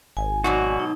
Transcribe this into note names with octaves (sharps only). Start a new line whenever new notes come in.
G#1 G#5
G#2 B2 F#3 F#4 D5 G#5 C#6
D#4